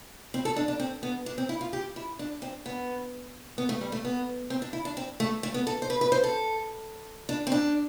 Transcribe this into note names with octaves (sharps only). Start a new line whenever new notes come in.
C4
A4
D4
D4
C4
B3
D4
C4
E4
F4
G4
E4
D4
C4
B3
B3
A3
G3
A3
B3
C4
D4
E4
D4
C4
A3
A3
B3
A4
C5
B4
B4
C5
A4
D4
C4
D4